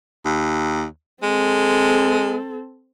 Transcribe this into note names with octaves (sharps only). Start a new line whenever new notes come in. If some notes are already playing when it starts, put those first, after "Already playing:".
D#2
G#3 C4 A4